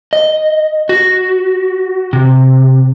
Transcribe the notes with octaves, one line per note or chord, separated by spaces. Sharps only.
D#5
F#4
C3